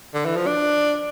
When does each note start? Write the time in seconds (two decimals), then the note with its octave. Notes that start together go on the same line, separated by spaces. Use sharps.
0.14 D3
0.25 E3
0.36 F3
0.47 D4